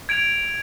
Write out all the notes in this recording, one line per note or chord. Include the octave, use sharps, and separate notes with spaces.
G#6 D7 F7